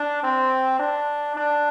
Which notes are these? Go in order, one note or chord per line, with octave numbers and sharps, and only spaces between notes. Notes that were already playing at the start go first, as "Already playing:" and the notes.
Already playing: D4
C4
D4
D4